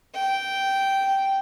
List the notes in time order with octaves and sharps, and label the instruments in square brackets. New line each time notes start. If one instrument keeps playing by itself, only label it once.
[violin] G5